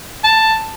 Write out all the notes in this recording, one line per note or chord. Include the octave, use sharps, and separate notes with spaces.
A5